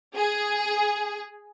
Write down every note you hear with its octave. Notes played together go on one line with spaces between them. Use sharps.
G#4